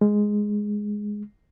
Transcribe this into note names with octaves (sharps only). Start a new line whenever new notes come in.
G#3